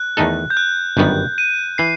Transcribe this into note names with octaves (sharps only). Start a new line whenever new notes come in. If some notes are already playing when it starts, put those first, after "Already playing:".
Already playing: F#6
E2 D#3 A3 D#4 A4
G6
F#6
G1 F#2 D#3 G3 B3
D#7
E3 C7